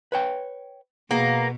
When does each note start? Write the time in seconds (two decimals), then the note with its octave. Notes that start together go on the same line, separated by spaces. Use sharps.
0.12 B4 C#5 G5
1.11 B2 A#3 B3 G#4